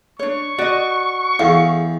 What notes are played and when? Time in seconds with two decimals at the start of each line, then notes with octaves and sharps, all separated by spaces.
0.19 D4 C#5 C#6
0.58 F#4 D5 D#5
1.39 E2 G#4 A4 F5